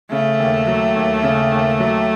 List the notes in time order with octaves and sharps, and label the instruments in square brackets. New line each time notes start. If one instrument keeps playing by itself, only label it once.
[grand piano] C#3 [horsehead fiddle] A3
[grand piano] D#2
F#3
D#2
C#3
D#2
F#3